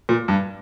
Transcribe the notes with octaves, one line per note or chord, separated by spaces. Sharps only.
A#2
G2